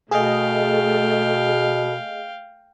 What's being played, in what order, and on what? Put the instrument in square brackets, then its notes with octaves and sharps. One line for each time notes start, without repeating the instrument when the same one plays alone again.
[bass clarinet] B2 [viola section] A3 [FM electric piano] G#4 D#5 [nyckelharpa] F5 G5